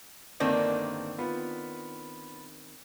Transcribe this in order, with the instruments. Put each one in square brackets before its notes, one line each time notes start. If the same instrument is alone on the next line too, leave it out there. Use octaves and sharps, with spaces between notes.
[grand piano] G1 D3 A#3 [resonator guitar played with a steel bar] D#3 C4 D4
[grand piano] B3 F4 B5